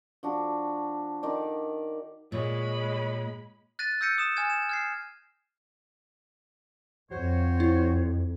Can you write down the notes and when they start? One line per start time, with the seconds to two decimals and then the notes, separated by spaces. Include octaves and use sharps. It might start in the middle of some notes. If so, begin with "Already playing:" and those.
0.23 F3 D4 F#4
1.23 D#3 D#4 D5
2.32 A#2 G#3 C#5 B5
3.79 F#6 A6 A#6 D#7
4.01 E6 G6 A#6 C#7 D#7
4.18 D#6 E7
4.36 G#5 F6 G#6 E7
4.50 E7
4.69 F6 G#6 C7
7.10 F2 F#4 C5 C#5
7.60 E4